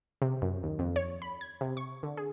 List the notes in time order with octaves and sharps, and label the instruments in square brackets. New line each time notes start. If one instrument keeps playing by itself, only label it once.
[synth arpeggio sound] C3
F#2
D#2
F2
C#5
B5
G#6
C3
C#6
D3
G#4